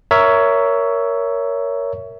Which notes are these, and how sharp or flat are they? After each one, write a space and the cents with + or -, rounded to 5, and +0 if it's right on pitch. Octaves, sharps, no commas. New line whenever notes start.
A#4 +0 C#5 +15 E5 +0